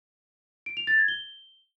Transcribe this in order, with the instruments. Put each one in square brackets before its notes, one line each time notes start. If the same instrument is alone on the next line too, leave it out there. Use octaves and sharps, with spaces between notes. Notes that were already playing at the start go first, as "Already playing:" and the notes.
[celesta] D7
F7
A6
G#6
G7